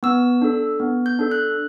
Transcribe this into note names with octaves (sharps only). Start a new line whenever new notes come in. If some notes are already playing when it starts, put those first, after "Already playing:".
B3 E6
D4 A4
B3
G6
D4 A4
F#6